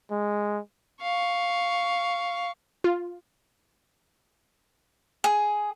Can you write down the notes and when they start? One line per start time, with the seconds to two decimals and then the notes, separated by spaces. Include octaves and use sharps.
0.11 G#3
1.02 F5 C#6
2.84 F4
5.24 G#4